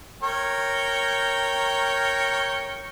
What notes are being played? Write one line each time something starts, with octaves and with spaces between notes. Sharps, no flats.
A#4 C#5 G5